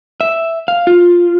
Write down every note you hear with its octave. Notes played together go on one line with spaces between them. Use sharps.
E5
F5
F4